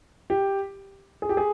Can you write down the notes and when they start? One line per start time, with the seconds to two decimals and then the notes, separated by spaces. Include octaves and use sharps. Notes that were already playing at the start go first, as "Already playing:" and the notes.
0.30 G4
1.22 G#4
1.29 G4
1.37 G#4